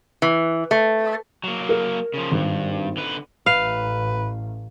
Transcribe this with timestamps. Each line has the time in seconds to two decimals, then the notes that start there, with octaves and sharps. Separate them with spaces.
0.22 E3
0.71 A3
1.44 F#3 A#3
1.69 A#4
2.14 C#3 F3
2.31 G#1 G2
2.97 D3 B4
3.46 A1 B4 F5